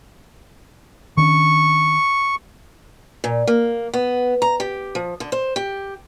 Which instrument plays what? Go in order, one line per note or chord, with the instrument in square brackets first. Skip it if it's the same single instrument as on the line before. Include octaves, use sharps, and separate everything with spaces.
[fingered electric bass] D#3 C#4 D4 [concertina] C#6
[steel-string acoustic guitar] A#2
A#3
B3
A#5
G4
F3
D3
C5
G4